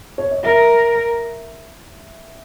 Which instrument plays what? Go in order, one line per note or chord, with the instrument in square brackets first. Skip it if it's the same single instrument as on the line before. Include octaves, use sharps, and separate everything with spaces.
[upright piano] C#5
D#5
[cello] A#4 [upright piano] E5